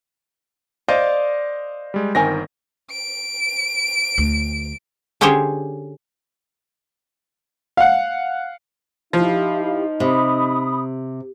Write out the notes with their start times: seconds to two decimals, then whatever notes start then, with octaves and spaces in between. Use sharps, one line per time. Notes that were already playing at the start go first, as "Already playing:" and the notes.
0.88 C5 D5 D#5 F5
1.94 G3 G#3
2.15 G1 D#3 C4 A#4 G#5 A#6
2.91 D7
4.18 D2
5.21 D3 C#4 G4 G#4 C5 C#5
7.77 F5 F#5
9.13 F3 D#4 E4 G4 F5
10.00 C3 B5 D#6